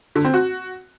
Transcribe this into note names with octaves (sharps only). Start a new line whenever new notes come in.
D3
C4
F#4